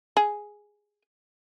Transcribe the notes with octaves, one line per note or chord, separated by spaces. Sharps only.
G#4